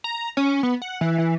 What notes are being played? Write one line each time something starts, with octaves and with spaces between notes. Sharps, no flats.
A#5
C#4
B3
F#5
E3
E3